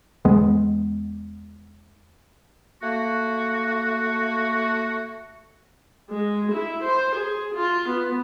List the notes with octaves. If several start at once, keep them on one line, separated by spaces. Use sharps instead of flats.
E2 G#3 B3
A3 A#3 F#4
G#3
E4
C5
G#4
F4
B3